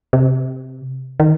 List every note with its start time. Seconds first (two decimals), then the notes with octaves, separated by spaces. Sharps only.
0.13 C3
1.20 D#3